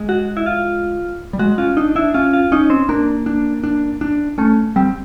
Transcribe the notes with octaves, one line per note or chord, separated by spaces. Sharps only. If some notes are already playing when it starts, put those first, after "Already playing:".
Already playing: G#3
F#4
E4
F4
G3
G#3 F#4
C#4 F4
D4 D#4
D4 E4
C#4 F4
F4
C#4 D#4
C4
A#3 D4
D4
D4
D4
A3 C#4
G3 C4